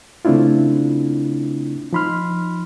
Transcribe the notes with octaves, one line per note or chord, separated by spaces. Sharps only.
C#3 A3 C4 D4 E4 F4
F3 D#4 B5 C6 F6